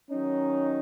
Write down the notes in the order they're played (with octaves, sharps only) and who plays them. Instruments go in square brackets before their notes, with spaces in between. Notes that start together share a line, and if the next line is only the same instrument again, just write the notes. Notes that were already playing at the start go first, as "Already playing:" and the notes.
[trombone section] D#3 F#3 D#4 [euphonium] C#4